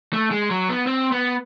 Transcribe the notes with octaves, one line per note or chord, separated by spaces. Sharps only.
A3
G#3
F#3
B3
C4
B3